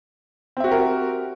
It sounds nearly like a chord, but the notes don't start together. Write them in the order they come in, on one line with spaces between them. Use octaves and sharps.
C4 E5 F#4 G4 A#4